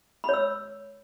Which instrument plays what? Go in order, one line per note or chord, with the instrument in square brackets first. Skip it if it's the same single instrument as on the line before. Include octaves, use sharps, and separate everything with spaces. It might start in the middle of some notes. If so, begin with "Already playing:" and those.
[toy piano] B5
C#5
E6